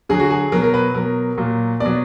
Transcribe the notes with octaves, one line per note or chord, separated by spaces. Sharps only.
D3 F#3 G#4
F#4
G#4
B2 F#3 A#4
A#4
B4
B2 F#3 A#4
A#2 F#3
B2 D5
F#3